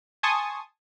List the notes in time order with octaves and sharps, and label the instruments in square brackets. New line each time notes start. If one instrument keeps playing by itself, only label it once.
[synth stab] G#5 A5 C6 C#6 D#6